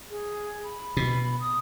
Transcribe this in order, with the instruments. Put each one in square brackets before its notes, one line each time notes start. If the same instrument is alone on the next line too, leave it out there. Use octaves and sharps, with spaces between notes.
[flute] G#4
B5
[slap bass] B2
[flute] D#6